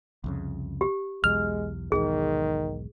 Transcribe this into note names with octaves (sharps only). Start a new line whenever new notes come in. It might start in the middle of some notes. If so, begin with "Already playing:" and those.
C2 F2 C#3
G4
B1 E2 G#3 F6
B1 E2 G#2 D#3 G#4